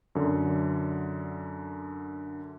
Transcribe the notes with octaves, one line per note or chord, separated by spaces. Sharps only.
F#2 D3